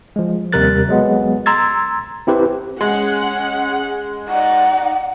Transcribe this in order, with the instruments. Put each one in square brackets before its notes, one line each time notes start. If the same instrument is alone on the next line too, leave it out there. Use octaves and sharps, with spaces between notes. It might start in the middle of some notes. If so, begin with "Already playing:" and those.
[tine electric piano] F3 G#3
D#2 C3 G3 A#4 F#6 A6
F#3 G#3 B3
A#5 C6 E6 G#6 A6
C4 E4 G4 B4 C5
[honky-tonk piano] G#3 [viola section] C#4 G#4 F#5
[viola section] D#4 D5 [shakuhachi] F#5